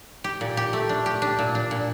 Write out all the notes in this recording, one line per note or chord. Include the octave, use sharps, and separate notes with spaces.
G4
A#2
G4
A3
D4
G4
D4
A#2
D4
A#2